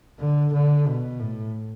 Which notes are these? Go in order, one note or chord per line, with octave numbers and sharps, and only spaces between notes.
D3
D3
B2
A2